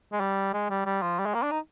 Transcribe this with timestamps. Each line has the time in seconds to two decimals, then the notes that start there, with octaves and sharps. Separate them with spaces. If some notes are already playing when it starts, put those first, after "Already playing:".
0.12 G#3
0.21 G3
0.53 G#3
0.70 G3
0.86 G3
1.02 F3
1.19 G3
1.26 G#3
1.34 A#3
1.42 D4
1.51 D#4